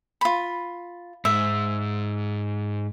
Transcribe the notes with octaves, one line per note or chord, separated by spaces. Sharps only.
F4 B5
G#2 E5